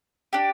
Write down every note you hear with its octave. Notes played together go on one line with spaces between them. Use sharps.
D4 G4